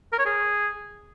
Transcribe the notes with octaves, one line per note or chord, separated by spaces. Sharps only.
A#4
C#5
G#4